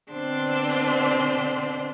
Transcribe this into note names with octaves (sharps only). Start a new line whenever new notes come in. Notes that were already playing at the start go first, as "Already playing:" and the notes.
B2 D3 C4 D4 C5 C6